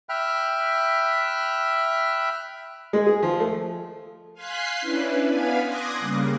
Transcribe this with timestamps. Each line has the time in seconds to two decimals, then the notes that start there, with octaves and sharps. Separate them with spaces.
0.09 E5 G5 B5 F6 F#6
2.93 G#3
3.06 G#4
3.23 F3
3.40 A3
4.33 F5 G#5 C6 F#6 B6 C7
4.81 C#4 D4 E4 B4
5.28 B3 D4 B4 F5 G#5 B5
5.63 C6 D6 D#6 F#6 G#6 A#6
5.99 C#3 G3 A#3